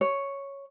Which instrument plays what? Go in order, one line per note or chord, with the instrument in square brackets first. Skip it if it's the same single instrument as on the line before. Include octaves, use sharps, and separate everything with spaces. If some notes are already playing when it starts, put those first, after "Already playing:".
[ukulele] C#5